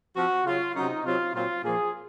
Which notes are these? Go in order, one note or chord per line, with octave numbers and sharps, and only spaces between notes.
F3 C4 F#4
C#3 F#3 C#4 F4
C3 F#3 C#4 D#4
C3 F#3 C4 F4
A#2 F#3 C4 F4
A#2 F3 A#3 G#4